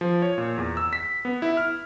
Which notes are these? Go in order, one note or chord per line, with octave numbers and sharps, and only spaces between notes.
F3
C#5
A#2
E2
E6
B6
B3
E4
F6